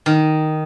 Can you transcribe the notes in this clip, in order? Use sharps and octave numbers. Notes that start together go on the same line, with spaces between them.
D#3